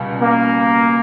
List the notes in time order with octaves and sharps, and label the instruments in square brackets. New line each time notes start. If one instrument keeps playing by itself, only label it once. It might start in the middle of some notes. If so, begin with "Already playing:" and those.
Already playing: [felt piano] C#2 B2 G3
[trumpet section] A#3